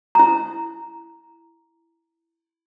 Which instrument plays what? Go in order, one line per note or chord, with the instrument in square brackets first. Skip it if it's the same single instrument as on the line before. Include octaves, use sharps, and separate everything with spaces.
[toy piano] E4 A#5